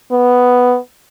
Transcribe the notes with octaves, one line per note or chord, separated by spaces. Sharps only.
B3